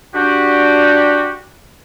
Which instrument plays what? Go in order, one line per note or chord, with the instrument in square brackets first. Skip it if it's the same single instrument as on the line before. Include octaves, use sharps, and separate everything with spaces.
[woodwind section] D4 F#4 G4